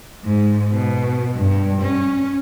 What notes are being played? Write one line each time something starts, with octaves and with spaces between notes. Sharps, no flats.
G#2
B2
G2
C#4